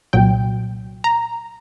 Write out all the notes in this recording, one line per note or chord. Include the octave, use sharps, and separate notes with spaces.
C2 A#2 F#3 G5
A#5